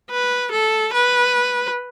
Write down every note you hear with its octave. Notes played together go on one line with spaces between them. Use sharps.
B4
A4
B4